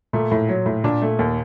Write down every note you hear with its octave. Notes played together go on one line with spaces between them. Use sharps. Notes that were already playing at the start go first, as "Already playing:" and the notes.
A#2 A3
A2
F#3
A2
A#2 D4
A3
D#2